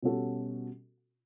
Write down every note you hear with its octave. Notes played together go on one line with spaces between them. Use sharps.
B2 G3 C#4 F#4 A4